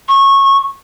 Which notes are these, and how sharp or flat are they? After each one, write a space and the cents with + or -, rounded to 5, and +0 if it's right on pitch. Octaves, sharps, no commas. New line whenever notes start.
C#6 -20